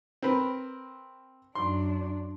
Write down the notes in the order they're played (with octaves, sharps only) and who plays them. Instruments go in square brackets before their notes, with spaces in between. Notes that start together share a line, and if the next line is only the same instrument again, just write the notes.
[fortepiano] C4 A#4 B4
[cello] F#2 D4 [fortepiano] C6